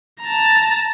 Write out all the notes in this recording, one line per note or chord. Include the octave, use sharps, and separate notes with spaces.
A5 A#5